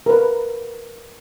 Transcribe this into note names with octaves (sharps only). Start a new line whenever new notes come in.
A#4 B4